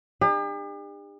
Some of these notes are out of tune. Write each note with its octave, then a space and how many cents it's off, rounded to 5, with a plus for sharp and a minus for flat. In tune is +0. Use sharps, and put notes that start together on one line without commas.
D4 +45 G4 +45